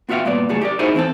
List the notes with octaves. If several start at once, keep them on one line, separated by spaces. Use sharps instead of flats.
B3 F4 F#4 E5 F5 G5
G2 A#2 B3 D5
C#2 A2 F#3 A3 G#4 A4
G4 A#4 D5
D#4 E4 F#4 G#4 C5 G#5
E2 C4 G4 A4